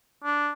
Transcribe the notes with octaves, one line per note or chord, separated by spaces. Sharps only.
D4